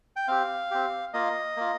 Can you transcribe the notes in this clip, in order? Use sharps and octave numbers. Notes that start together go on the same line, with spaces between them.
G5
C4 G4 F5
C4 G4
A#3 F4 D#5
A#3 F4